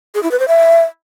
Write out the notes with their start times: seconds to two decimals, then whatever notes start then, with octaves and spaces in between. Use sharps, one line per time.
0.15 G#4
0.23 E4
0.31 B4
0.40 C5
0.48 E5